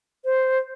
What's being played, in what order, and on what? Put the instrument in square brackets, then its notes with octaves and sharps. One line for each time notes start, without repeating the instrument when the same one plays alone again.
[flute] C5